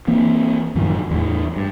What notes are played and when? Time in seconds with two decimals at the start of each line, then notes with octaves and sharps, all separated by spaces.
0.07 E3 A#3 C4
0.75 F#2 A2 D#3 F3
1.11 E2 A2
1.56 G2